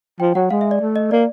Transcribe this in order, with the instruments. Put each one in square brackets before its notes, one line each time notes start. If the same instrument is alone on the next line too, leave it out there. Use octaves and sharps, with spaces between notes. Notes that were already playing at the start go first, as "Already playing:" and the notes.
[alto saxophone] F3 [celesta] G5
[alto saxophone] F#3 [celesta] F#5
[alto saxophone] G#3 [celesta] F5
[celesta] E5
D5
[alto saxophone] A3
[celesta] D#5
[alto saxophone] A#3 [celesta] D5